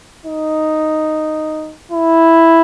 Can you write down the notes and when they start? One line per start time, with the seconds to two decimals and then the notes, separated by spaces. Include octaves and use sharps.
0.25 D#4
1.91 E4